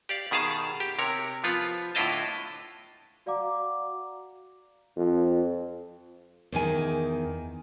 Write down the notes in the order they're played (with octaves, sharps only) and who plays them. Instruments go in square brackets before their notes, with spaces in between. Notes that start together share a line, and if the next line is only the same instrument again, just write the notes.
[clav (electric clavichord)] G4 D5 F5
B2 D#3 G#4 F5 A5
G4
C3 A#4 C#5
F3 B3 F4
A2 D3 E4 F4 D#5 A5
[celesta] F#4 D5 F5 F#5 A#5 D6
[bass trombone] F2
[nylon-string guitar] E2 D#3 G#5